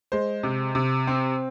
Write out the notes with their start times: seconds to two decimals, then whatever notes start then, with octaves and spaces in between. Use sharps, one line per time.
0.12 G#3 C5
0.43 C3
0.75 C3
1.07 C4